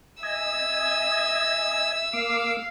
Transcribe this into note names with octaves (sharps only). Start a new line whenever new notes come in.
D#5 E5 G#5 E6
A#3 F5 D6